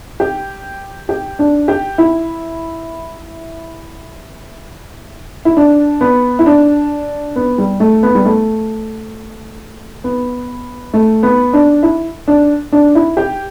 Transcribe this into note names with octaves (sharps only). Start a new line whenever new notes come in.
G4
G4
D4
G4
E4
E4
D4
B3
E4
D4
B3
G3
A3
B3
G3
A3
B3
A3
B3
D4
E4
D4
D4
E4
G4